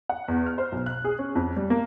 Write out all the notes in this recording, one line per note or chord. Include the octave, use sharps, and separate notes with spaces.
F#5
E2
F6
C5
B1
F#6
G#4
C#4
F2
G3
A#3